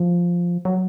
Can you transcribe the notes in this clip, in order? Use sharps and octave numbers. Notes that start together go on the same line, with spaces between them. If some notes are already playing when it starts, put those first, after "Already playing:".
Already playing: F3
F#3